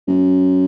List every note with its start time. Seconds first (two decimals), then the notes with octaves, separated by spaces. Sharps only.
0.08 F#2